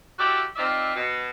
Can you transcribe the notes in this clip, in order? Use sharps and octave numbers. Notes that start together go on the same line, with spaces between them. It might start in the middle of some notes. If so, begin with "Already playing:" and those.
E4 F#4 G4 A4 D5
C4 D#4 F4 D5 E5
B2